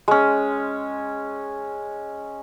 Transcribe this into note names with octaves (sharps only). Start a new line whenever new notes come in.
G#3 C#4